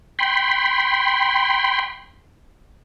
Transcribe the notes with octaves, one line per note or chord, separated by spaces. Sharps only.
G5 B5 C6